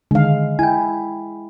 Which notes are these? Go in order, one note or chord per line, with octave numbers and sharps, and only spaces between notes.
D3 D#3 G#3 F5
E4 G5 G#5